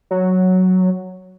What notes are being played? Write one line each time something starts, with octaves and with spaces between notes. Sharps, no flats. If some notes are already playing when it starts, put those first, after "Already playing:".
F#3